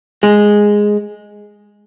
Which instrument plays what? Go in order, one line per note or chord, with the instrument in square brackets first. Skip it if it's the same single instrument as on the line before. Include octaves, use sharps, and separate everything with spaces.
[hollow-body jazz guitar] G#3